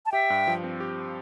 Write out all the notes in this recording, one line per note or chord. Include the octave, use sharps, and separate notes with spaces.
A5
G4 E5 G5
G2
F3
C4
G4